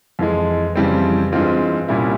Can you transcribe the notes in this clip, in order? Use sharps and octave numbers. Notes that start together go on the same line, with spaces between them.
F2 E3 G#3
F2 C#3 E3 G3 C4
G2 E3 G#3 C4 F4
C2 A#2 G3 C#4 E4